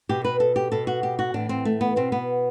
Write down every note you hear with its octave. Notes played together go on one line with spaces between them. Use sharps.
B2 G4
B4
A4
G4
B2 A4
F#4
G4
F#4
A2 E3 D4
C4
A3
B3
B2 C4
B3